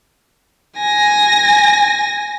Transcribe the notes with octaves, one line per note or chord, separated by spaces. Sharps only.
G#5 A#6